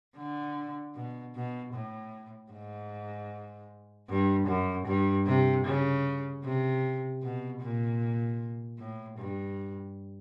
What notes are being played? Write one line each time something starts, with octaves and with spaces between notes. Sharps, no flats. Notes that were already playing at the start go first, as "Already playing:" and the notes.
D3
B2
B2
A2
G#2
G2
F#2
G2
C3
C#3
C3
B2
A#2
A2
G2